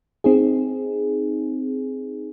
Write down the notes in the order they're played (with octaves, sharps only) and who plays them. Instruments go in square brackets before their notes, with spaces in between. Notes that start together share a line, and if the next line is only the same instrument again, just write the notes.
[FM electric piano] C4 D#4 G#4